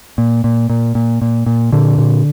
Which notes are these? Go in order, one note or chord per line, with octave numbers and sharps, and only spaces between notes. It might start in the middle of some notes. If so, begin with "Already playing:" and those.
A#2
A#2
A#2
A#2
A#2
A#2
A#2 D3
A#2